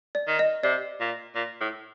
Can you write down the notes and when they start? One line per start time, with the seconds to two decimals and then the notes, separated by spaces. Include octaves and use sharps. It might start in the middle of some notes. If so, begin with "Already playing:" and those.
0.15 D5
0.28 D#3
0.39 D#5
0.63 C3 D5
1.00 A#2
1.35 A#2
1.61 A2